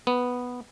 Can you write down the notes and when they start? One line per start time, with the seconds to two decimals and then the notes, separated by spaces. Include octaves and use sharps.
0.07 B3